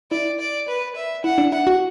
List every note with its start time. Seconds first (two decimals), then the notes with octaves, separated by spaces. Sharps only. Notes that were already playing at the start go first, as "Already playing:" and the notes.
0.11 E4 D5
0.40 D5
0.68 B4
0.96 E5
1.24 E4 F#5
1.38 D4
1.52 E4 F#5
1.67 F#4